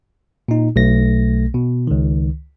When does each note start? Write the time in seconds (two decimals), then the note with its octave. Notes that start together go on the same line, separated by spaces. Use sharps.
0.48 A#2 D#4
0.76 B1 A3 A#6
1.54 B2
1.87 C#2 D#3